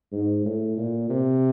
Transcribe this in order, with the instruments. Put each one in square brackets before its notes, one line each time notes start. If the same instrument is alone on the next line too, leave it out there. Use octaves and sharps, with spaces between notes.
[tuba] G#2
A2
A#2
C3